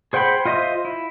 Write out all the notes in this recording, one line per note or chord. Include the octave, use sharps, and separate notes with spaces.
G#4 C5 F#5 G5 B5
F4 C5 D#5 E5
E4